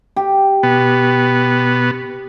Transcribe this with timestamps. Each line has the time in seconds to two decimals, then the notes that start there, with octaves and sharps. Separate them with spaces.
0.16 G4
0.63 B2 B3